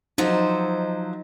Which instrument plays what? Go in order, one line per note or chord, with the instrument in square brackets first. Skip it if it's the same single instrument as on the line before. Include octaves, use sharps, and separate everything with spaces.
[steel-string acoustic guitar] F3 F#3 C5 [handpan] D#4